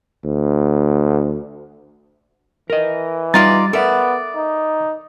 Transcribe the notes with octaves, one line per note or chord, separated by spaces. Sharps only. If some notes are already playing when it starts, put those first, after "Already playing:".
D2
E3 A#4 D#5
G3 D#4 F4 D5 A6
B3 A4 A#4 D5 E5
D#4